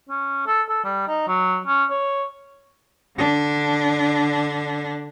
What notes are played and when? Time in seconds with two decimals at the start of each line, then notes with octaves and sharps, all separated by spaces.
0.09 C#4
0.47 A4
0.69 A4
0.84 G3
1.07 D#4
1.27 F#3
1.67 C#4
1.90 C#5
3.17 D3 D4